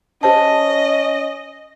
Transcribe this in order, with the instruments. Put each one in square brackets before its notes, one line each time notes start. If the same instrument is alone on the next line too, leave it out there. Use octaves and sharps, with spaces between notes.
[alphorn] C#4 [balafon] G4 C5 A5 [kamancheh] D#5